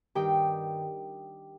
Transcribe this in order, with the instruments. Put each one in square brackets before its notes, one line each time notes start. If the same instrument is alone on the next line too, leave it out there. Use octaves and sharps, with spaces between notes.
[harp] G2 D#3 G4 G5